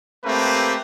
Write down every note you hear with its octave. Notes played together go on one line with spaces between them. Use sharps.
A3 A#3 C4 G4 B4